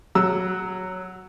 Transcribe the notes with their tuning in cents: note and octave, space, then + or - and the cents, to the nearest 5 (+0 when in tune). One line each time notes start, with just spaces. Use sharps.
F#3 +0 E6 +0